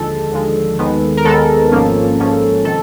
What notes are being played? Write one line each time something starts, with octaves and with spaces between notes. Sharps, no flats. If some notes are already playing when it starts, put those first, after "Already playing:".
Already playing: D#2 D3 F3 G#3 A4
D#2 D3 F3 G#3
D#2 D#3 G#3 B3
A#4
D#2 D#3 G#3 B3 A4
G#1 G#2 F3 A#3 C#4
G#1 G#2 F3 A#3 C#4
C3 D#3 A4